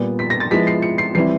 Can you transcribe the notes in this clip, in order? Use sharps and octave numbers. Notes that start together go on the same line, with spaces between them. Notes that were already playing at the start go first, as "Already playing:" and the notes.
Already playing: A#2 G3 B3
B6
A#6
A6
F3 G#3 B3 E4 B6
C7
C#7
C7
E3 G3 C4 E4 C7